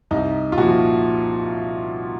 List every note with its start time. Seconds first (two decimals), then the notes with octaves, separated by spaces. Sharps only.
0.11 C2 D#4
0.52 F4
0.58 A#2 F3 F#4